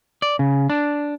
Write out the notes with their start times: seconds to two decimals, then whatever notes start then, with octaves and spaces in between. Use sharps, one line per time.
0.22 D5
0.39 C#3
0.70 D4